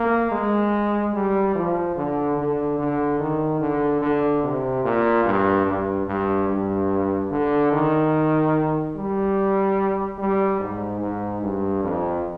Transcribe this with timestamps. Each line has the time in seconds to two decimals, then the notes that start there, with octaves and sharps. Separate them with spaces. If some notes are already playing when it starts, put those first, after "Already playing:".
Already playing: A#3
0.31 G#3
1.13 G3
1.55 F3
1.96 D3
2.37 D3
2.78 D3
3.19 D#3
3.60 D3
4.01 D3
4.43 C3
4.84 A#2
5.25 G2
5.66 G2
6.07 G2
6.48 G2
7.31 D3
7.72 D#3
8.96 G3
10.18 G3
10.60 G#2
11.01 G#2
11.42 G2
11.83 F2